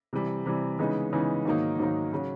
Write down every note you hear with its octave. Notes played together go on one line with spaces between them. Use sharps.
C3 E3 G3
C3 E3 G3
C#3 E3 G#3 B3 D#4
C#3 E3 G#3 B3 D#4
G#2 D#3 F#3 A#3 D#4
G#2 D#3 F#3 A#3 D#4
C#3 F#3